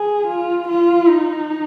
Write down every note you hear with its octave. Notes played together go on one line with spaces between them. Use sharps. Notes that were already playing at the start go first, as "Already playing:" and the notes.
Already playing: G#4
F4
F4
D#4